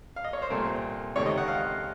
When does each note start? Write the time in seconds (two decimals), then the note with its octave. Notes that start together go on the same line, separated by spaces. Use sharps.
0.16 F5
0.25 D#5
0.33 C#5
0.42 C5
0.50 C2 A#2 A3 C4 A#4
1.16 C#2 C3 D#3 A3 C4 C#5
1.26 D#5
1.38 F#5
1.48 F5